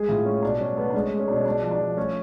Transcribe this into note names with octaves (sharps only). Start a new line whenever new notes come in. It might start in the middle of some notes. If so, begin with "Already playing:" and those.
Already playing: G#3 G#4
A2 F4
G#3 C#4
B2 D4
F#3 C#4
A3 B3
D4
G#3 C#4
G#3
C#4
B2 D4
C#4
G#3 D4
F3
D4
F3
A3 C#4